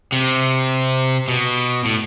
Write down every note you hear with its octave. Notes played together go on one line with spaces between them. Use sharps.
C3
B2
A2